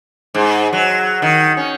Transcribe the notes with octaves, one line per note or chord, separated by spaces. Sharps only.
G#2
F#3
D#3
C#4